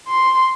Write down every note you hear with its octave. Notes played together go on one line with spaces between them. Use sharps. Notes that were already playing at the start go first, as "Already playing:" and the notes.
C6